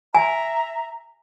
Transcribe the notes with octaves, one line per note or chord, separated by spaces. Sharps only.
E5 G#5 A#5